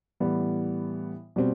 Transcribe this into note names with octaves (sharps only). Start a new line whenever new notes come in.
A2 E3 G3 B3
B2 G3 C4